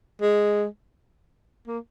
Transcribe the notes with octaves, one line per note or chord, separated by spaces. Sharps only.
G#3
A#3